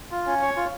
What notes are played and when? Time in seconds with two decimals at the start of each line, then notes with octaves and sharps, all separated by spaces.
0.11 F4
0.27 C#4
0.42 C#5
0.56 F4